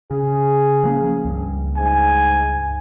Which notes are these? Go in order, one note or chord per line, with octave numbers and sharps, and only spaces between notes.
C#3 G#4
F3 A#3 C#4
C#2 G2
G#2 G#5